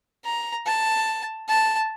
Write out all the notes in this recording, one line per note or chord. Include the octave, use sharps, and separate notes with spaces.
A#5
A5
A5